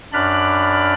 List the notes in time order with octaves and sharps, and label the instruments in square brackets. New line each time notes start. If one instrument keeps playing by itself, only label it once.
[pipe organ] F#2 D4 D5 B5 F6 F#6